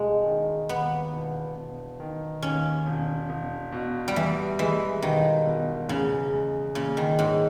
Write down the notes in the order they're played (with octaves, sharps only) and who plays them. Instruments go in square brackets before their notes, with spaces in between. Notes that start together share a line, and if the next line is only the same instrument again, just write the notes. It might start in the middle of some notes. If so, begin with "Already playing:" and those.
Already playing: [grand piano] E1 [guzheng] G#3
[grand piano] D#3
[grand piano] D#2 [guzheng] B3
[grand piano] E1
E1
D#3
[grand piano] D#2 [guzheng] C#4
[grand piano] E1
E1
B2
[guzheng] G3
[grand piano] E2 [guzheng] E3
[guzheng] E3 [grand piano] G#3
[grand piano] E1 [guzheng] D#3
[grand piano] B2
[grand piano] E2 [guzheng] C#3
[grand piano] G#3
[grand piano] A#2 [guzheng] C#3
[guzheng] D#3
[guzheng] G#2 [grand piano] C#4